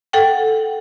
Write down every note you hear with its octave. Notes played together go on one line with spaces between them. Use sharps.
A4 F#5 G5